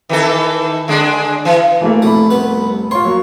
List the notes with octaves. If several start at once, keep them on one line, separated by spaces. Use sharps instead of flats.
D#3 E3 A4
D3 G#3 D4
E3
E3 A3 A#3
F1 A3 B5
C2 B3 B4
F4 C#5 C6
F#3 A#3